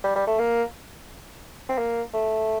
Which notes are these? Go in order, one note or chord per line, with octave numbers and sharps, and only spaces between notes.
G3
G3
A3
A#3
C4
A#3
A3